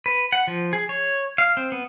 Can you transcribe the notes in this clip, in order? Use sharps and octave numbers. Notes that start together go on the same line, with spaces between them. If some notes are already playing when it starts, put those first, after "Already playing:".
B4
F#5
F3
G#4
C#5
F5
C4
B3